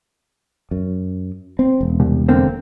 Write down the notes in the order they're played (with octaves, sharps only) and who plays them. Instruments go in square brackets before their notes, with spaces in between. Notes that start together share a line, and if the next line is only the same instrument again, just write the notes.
[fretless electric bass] F#2
C4
E1
[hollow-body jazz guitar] C2
D3 A#3 C4